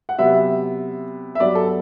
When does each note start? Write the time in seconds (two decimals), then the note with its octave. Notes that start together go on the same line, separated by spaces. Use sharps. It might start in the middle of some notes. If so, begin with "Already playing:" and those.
0.09 F#5
0.19 C3 F#3 B3 E5
1.35 E5
1.40 G2 F#3 B3 D5
1.55 A4